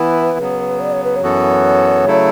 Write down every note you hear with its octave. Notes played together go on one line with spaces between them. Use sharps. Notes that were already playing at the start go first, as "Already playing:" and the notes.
Already playing: E3 B3 E4 B4
C#3 F#3 B3
D5
C#5
B4
C#5
F#2 E3 B3 F#4 A4
C#3 F#3 A3 E4 A4